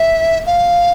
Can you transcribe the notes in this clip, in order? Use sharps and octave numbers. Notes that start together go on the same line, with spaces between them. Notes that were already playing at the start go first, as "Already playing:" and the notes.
Already playing: E5
F5